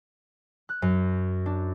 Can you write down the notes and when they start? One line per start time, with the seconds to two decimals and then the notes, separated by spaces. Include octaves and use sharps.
0.69 F#6
0.82 F#2
1.46 D4